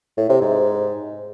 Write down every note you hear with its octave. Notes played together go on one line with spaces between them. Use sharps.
A2
C3
G#2